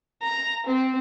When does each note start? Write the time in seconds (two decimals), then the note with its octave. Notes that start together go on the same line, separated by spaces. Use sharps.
0.22 A#5
0.66 C4